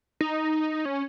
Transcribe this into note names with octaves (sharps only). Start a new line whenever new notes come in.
D#4
C#4